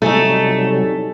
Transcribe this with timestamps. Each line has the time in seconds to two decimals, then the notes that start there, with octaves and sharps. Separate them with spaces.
0.02 C3 F#3 G3 A3 D#4 G#5